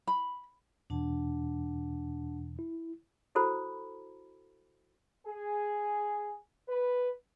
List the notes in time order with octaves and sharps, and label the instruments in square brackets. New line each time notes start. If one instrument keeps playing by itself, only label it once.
[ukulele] B5
[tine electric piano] E2 B2 E3 [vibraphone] D4 F#5 A5
[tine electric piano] E4
[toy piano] E4 F#4 A4 C5 A#5 B5
[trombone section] G#4
B4